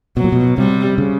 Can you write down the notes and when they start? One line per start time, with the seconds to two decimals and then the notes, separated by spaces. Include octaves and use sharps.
0.17 B2 F#3
0.24 A#2
0.32 B2
0.58 C3 G3
0.98 C#3